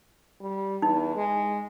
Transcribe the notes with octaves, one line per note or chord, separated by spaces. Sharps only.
G3
E2 D#4
G#3